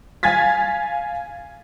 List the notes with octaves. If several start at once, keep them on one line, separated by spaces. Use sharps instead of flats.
F5 G#5 G#6 A6 B6